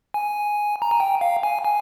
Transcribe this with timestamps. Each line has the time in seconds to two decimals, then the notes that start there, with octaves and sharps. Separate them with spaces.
0.14 G#5
0.82 A#5
0.91 G#5
1.00 G5
1.21 F5
1.43 G#5
1.65 G#5